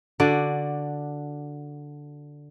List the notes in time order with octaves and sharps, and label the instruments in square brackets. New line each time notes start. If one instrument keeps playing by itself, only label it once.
[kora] D3 F#4 D5